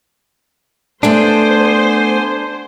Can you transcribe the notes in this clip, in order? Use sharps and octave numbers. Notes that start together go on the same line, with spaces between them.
A3 B3 D4 A4 C5 F#5 G#5